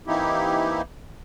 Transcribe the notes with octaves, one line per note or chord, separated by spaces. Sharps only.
E3 A#3 C4 D#4 E4 G4